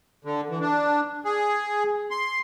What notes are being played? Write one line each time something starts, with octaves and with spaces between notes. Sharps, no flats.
D3
E3
D4
G#4
C6